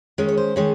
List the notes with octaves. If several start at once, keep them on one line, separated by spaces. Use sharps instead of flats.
D#3 G#3 C#4 C#5
C#5
C5
D#3 G#3 C#4 C#5